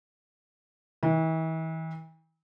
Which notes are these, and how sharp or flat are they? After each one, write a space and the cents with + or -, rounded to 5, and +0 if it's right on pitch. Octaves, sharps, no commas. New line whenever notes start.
E3 -40